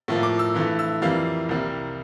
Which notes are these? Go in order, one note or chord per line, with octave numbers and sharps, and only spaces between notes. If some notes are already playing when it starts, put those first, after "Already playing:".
A2 F3 A#3
D6
E6
G2 E3 A3
E6
F2 E3 G3 A#3 F5
C2 C3 G3 A#3